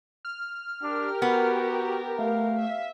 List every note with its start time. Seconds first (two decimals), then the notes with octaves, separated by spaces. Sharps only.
0.25 F6
0.83 D4 G4 A#4
1.22 B3 F#4
2.19 A3 F5
2.60 E5